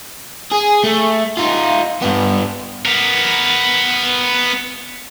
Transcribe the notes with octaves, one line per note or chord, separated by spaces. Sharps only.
G#4
A3
D#4 F4
G2 B3
B3 A#4